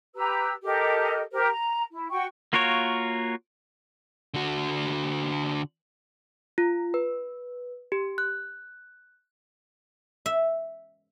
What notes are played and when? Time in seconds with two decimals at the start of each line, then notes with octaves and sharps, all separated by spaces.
0.15 G4 B4 A#5 E6
0.64 G4 A4 A#4 D#5
1.32 G4 A#4 C5
1.47 A#5
1.90 E4
2.10 F#4 G5 C#6
2.53 A#3 F4 F#4 A#4 C#5
4.34 D3 F#4
6.58 F4
6.94 B4
7.92 G4
8.18 F#6
10.26 E5